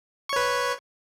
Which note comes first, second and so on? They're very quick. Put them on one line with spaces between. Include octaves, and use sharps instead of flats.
C#6 C#5 B4